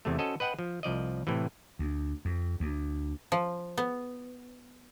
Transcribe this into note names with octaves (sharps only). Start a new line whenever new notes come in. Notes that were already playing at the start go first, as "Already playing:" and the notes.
E2 C3 A3
C#4 F#4 A4 C5 D#5
B4 D#5 F#5 G5
F3
C2 F3 D5 D#5
A2 C3 E3
D2
F2
D2
F3
B3